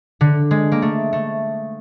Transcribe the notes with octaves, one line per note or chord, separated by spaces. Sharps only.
D3
G#3
A#3
A3
A3